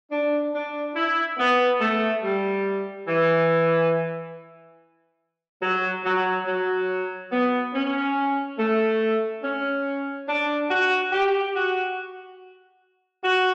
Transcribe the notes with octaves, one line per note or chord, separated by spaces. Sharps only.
D4
D4
E4
B3
A3
G3
E3
F#3
F#3
F#3
B3
C#4
A3
C#4
D4
F#4
G4
F#4
F#4